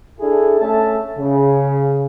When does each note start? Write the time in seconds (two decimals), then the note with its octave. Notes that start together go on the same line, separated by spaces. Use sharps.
0.20 D4 E4 G#4 A4
0.60 A3 C#4 A4 E5 A5
1.18 C#3